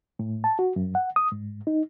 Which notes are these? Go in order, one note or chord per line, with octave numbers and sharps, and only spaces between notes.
A2
A5
F#4
F#2
F#5
D#6
G#2
D#4